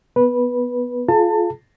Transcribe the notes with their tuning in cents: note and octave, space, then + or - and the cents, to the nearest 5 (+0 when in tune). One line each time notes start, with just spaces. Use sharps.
B3 +0 B4 -15
F4 +0 G#4 +45 A5 +30